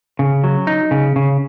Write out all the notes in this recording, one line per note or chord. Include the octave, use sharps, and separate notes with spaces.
C#3
F#3
D#4
C#3
C#3